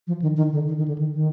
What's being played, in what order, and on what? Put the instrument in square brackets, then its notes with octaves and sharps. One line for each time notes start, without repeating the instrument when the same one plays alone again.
[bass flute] F3
D#3
D#3
D3
D#3
D#3
D3
D#3
D#3